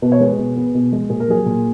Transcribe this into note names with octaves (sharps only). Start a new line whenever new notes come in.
B2 B4
C#5
G#3 G#4 B4
B2
B3
B2
G#3
A#2 G#4
A#4
F#3 G#4
A#2